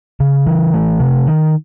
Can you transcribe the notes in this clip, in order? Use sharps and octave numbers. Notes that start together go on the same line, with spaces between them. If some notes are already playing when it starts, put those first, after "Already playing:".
C#3
E3
A3
C3
D#3